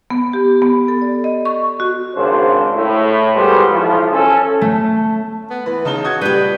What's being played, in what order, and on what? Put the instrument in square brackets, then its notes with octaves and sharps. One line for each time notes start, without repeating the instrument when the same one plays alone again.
[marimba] B3
G4
B3
A4
D5
D#5
C#6
F#4
[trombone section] G#1 C#3 F#3 D4 C5
A2
G3 G#3 B3 F#4 C5
B1 E3 F3
C#4 A4
[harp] A3
[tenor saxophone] B3
[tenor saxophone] E3 [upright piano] B4
[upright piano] C#3 A5 G7 [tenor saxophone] D#4
[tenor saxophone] F#4 [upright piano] D#6 G#6
[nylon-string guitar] G3 G4 [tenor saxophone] B4 [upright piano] G6